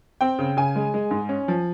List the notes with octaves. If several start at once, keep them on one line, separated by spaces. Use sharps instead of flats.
C4 G5
C#3
C#3 G#5
G#3
G#3
G#2
C#4
F3